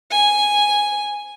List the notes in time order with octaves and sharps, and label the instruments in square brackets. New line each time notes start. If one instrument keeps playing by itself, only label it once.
[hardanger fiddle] G#5